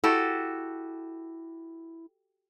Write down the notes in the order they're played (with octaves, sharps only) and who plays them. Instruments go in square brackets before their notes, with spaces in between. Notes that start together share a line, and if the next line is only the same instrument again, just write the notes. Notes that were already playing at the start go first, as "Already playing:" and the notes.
[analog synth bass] E4 [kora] F#4 G4 A4